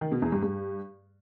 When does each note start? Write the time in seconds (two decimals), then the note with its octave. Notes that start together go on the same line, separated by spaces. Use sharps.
0.01 D#3
0.12 B2
0.22 E2
0.32 G2
0.43 G2